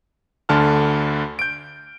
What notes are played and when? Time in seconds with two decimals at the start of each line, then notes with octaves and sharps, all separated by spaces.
0.49 D2 D3 A5 F6
1.39 G6 D7